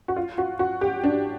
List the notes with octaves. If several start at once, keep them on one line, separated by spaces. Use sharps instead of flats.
F#4
F4
F#4
F#4
G4
D4